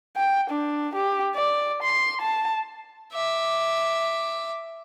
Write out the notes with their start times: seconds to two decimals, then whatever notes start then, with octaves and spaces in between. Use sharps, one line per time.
0.17 G5
0.50 D4
0.95 G4
1.35 D5
1.83 C6
2.21 A5
3.12 E5 D6